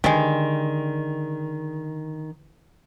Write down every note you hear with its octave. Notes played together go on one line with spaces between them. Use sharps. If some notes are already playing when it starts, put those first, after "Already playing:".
D3 D#3 G3 G#3